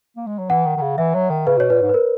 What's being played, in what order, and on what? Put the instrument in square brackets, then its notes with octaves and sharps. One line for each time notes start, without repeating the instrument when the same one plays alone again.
[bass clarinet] A#3
G#3
F#3
[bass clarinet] E3 [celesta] F#5
[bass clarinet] D#3
D#3
C#3
[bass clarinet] E3 [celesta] E5
[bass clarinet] F#3
D#3
[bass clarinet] C#3 [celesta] B4
[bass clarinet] B2 [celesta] C#5
[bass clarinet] A#2 [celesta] B4
[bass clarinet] G#2
[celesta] B4
A#4